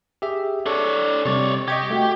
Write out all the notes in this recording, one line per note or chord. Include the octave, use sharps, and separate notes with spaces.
G4 G#4 E5
D4 A4 C#5
C3 G3 C#5 D5
G4 D#5 C#6 G#6
A3 F#4